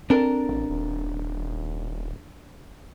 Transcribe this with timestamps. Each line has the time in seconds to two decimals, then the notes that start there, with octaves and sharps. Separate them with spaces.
0.10 C4 D4 A4 A#4
0.49 A1
0.70 D#1